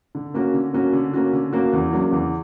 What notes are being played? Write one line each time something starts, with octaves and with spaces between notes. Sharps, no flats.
D3
A#3 C#4 F#4
D3
A#3 C#4 F#4
D3
A#3 C#4 F#4
D3
A#3 C#4 F#4
E2
C#3 F#3 A#3 D4
E2